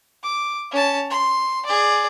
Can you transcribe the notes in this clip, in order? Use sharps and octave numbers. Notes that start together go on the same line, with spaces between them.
D6
C#4 A5
C6
G#4 D5